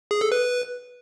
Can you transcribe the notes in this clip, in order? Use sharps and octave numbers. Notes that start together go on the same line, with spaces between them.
G#4
A4
B4